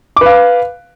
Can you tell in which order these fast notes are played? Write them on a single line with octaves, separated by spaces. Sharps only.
D6 B4 F5